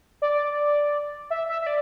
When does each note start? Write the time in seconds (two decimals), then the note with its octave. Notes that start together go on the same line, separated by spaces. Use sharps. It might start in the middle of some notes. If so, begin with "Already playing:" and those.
0.22 D5
1.30 E5
1.49 E5
1.61 E5
1.67 D5